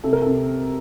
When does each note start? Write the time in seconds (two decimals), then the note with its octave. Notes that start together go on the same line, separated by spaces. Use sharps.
0.04 C3 A4
0.13 A#4
0.22 C3 A4